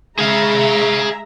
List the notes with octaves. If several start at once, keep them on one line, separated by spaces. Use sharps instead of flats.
G#3 G#4 E5 F5 A#5